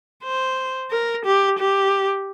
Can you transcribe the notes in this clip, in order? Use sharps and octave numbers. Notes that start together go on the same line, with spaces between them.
C5
A#4
G4
G4